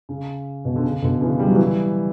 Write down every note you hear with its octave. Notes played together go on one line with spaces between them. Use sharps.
C#3
B2
D3
C#3
B2 D3
C#3 E3
G3
F#3
E3 G3